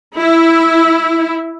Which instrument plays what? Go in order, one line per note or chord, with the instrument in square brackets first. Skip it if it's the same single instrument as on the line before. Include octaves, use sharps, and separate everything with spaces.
[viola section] E4